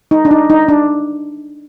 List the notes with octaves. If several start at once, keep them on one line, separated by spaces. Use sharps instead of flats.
D#4
D4
D#4
D#4
D4